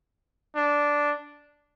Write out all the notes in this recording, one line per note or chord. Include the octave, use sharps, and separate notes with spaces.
D4